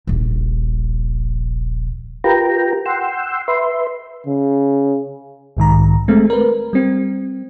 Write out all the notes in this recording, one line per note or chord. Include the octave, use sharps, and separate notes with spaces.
D#1 A#1
F4 G4 A#4 B4 G5 A#5
F#5 G5 C6 E6
B4 E5 C6
C#3
B1 G#2 D#3 A#5
G#3 A3 C4
A#4 B4
G3 C4